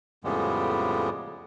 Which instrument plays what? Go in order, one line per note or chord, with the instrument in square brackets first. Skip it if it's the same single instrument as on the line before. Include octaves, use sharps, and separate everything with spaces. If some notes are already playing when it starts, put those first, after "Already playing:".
[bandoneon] F2 A2 C#3 G3 G#3 B3